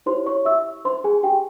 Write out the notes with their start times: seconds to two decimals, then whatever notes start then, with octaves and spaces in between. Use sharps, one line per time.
0.06 E4 G4 C5 C#5 C6
0.26 C#5 C#6
0.45 E5 E6
0.85 C5 C6
1.04 G#4 G#5
1.23 G4 G5